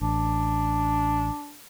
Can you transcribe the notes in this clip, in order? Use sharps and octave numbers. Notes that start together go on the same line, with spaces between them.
A1 D4